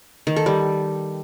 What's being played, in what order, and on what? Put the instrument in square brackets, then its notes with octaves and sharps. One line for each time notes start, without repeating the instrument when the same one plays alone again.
[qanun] D#3
A4
G3